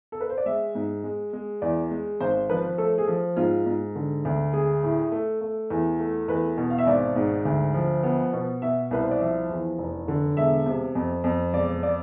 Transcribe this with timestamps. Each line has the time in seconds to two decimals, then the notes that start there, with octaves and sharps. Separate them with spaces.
0.12 A4
0.21 B4
0.30 C5
0.38 D5
0.46 G#3 E5
0.75 G#2
1.04 G#3
1.33 G#3
1.62 E2 D5
1.91 G#3
2.20 G#1 C5
2.50 F3 B4
2.78 A3 A4
2.98 G#4
3.08 F3
3.37 G#2 F4
3.66 G#2
3.96 D3
4.25 D2
4.53 G#3 G#4
4.83 A2
5.12 A3
5.41 A3
5.70 E2
6.00 A3
6.28 E2 B4
6.58 B2
6.70 F5
6.78 E5
6.87 G#1 D5
7.16 G#2
7.45 D2
7.74 F3
8.03 B3
8.33 B2
8.62 B2 E5
8.91 C2 B4
9.02 C5
9.11 D5
9.20 F3 E5
9.49 E2
9.78 F1
10.08 D3
10.37 E1 E5
10.66 C3
10.95 F2
11.24 F2
11.53 E1 D5
11.83 D5